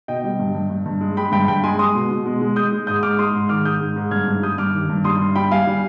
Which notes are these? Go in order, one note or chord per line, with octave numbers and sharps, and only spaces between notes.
B2 D#5 G5
G3
G2
G2
G2
G2
G#3
G#3 G5 B5
G2 G5 B5
G2 G5 B5
G#3 G#5 C6
G#3 C6 D#6
B2
B2
G#3
G#3
G#3 D#6 G6
G#3
G#2 D#6 G6
G#3 D6 F6
G#3 C6 D#6
G#2
D#3 D6 F6
G#2 D#6 G6
G#2
G#2
G2 F6 G#6
G2
G3 D#6 G6
G2 D6 F6
D#3
G2
G3 C6 D#6
G2
G3 G5 B5
G3 F5 G#5
G3